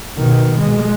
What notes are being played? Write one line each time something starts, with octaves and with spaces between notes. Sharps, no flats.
B2 D#3
G#3